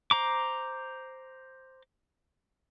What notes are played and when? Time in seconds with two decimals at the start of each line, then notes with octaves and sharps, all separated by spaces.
0.11 C5 A#5 D6